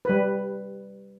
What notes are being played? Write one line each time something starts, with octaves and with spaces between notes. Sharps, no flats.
G3 B4